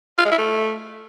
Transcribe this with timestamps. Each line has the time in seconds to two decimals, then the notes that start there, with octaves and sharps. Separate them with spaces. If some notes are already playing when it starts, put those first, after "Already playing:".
0.18 F4
0.25 G#3
0.32 E4
0.38 A3